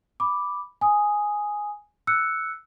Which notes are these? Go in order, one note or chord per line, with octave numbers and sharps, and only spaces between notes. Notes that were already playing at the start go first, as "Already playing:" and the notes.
B5 D6
G#5 D#6
E6 F#6 C#7